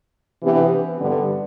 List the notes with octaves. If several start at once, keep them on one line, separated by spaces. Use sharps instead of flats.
C3 E3 B3 D4 G4
G2 D3 G3 B3